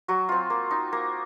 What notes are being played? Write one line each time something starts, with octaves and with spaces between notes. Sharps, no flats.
F#3 F#4
C4 F4
A#3
D#4
A#3